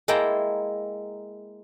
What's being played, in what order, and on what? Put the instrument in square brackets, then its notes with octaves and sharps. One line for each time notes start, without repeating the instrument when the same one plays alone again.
[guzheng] G#3 A#3 E4 G5 A5 A#5